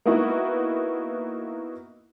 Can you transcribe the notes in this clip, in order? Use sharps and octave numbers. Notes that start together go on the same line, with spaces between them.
A#3 B3 D#4 E4 F#4 B4